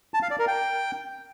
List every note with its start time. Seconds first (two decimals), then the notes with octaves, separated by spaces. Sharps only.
0.14 A5
0.22 F5
0.31 D5
0.39 A#4
0.47 G5